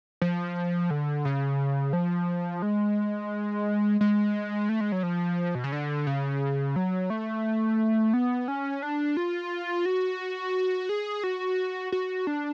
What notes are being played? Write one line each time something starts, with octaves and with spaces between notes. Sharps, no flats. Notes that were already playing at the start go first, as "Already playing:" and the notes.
F3
D3
C#3
F3
G#3
G#3
A3
G#3
F#3
F3
B2
C#3
D3
C#3
F#3
A3
B3
C#4
D4
F4
F#4
G#4
F#4
F#4
D4